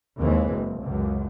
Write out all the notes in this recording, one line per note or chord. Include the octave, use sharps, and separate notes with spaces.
D#2 E3 G#3 C4
F#1
C#2 F#2